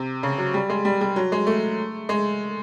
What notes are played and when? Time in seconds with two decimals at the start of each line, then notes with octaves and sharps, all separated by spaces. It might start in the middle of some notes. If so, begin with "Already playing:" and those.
Already playing: C3
0.23 C#3
0.38 F#3
0.54 G3
0.69 G#3
0.85 G3
1.01 G3
1.16 F#3
1.32 G#3
1.47 A3
2.09 G#3